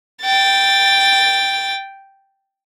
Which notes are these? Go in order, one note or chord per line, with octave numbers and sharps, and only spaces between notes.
G5 A6